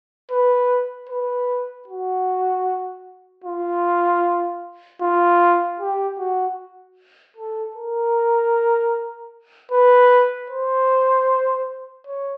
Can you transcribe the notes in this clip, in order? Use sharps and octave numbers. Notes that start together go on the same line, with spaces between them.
B4
B4
F#4
F4
F4
G4
F#4
A4
A#4
B4
C5
C#5